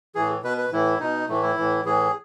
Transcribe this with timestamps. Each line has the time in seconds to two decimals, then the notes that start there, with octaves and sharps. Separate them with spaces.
0.15 A2 E3 G#4
0.43 B2 B4
0.58 B4
0.72 A2 E3 E4
1.00 B2 D#4
1.29 A2 E3 A3
1.43 E4
1.58 A2 E3
1.85 A2 E3 G#4